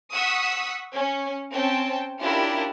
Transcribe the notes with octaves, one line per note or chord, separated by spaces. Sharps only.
F#5 C#6 D#6 E6 B6
C#4
C4 C#4 G5 A5
C#4 D4 E4 F4 G4 A#4